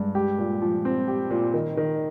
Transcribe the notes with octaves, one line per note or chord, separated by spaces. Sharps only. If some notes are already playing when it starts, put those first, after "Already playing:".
Already playing: G2 G#3
G4
A#2
F3
C4
G4
A#2
D#3
D#3